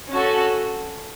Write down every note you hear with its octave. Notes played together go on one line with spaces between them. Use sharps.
C#4 F#4 A4